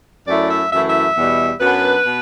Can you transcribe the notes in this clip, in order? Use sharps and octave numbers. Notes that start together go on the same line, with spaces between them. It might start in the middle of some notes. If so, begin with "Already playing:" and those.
F#2 F#3 A3 E4 D5
E5
F#2 E3 A3 E4 E5
E5
E2 B2 G3
F#2 F#3 B3 D4 B4
B2